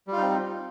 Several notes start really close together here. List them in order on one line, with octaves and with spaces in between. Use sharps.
G3 F4 D#4 C4